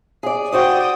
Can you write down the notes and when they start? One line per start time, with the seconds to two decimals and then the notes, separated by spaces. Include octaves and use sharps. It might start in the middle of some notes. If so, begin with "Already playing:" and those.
0.23 G#4 D5
0.52 F#4 C5 D5 G5 D#6